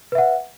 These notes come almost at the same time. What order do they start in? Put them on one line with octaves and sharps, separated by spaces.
B4 E5 F#5